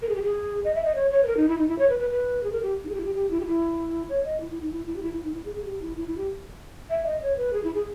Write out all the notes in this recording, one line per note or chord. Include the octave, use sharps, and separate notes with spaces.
A#4
G#4
G4
G#4
D#5
E5
D#5
C#5
C#5
B4
A#4
D#4
E4
D#4
E4
C#5
B4
B4
B4
G#4
A#4
G4
D#4
G#4
G4
E4
G4
G4
E4
G4
E4
C#5
D#5
E4
E4
D#4
E4
E4
G4
E4
E4
D#4
E4
G#4
G#4
G4
E4
E4
E4
G4
E5
D#5
C#5
B4
G#4
E4
G#4